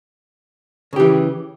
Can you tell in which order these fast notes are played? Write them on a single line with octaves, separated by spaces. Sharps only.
C#3 G4 E3